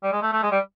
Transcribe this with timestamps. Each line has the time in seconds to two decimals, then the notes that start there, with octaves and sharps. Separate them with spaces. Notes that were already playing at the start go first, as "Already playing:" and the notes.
0.03 G3
0.12 G#3
0.22 A3
0.33 A3
0.43 G#3
0.52 G3